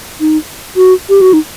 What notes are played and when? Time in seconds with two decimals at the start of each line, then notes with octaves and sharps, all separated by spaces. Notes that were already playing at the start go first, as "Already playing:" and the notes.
0.20 D#4
0.77 F#4
1.09 G4
1.21 F#4
1.33 D#4